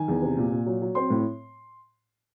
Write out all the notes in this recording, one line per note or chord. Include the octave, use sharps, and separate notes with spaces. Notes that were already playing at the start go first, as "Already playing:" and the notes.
Already playing: D#3 G#5
E2
C3
A#2
A#2
F#3
F#3
C4 C6
A2